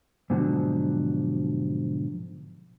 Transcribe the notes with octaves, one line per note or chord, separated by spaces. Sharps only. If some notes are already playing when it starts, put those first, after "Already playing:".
G#2 B2 D3 F3 F#3